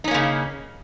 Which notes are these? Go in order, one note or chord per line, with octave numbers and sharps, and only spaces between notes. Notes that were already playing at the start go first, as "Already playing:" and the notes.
C#3 A#3 C#4 D#4